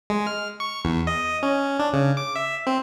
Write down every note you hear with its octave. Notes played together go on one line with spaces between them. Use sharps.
G#3
F6
C#6
E2
D#5
C#4
D4
C#3
D6
E5
C4